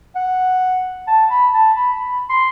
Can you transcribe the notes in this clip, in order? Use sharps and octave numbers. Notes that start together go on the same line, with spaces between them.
F#5
A5
B5
A5
B5
B5
C6